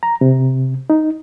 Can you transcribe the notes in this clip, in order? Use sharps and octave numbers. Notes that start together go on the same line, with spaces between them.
A#5
C3
D#4